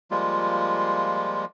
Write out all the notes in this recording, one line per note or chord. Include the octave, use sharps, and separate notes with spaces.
F3 G3 G#3 A#3 F4